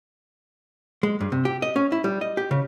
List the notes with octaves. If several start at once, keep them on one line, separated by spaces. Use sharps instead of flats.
G#3
G2
C3
G4
D#5
C#4
E4
G3
D#5
G4
C#3